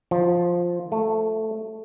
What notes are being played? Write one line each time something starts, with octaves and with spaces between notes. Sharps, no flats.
F3
A3